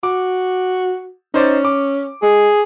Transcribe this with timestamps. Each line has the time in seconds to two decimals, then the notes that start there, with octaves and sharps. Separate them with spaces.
0.03 F#4 D6
1.34 C#4 D#4 C5 D5
1.65 D6
2.23 G#3 G#4